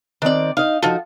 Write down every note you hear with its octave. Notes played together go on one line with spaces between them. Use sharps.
D#3 C4 D4 D5
D#4 D#5 F5
F3 D#4 F4 F#4 A4